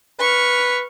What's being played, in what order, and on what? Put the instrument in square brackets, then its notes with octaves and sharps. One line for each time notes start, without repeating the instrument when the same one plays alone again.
[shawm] B4 [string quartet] C#6 F6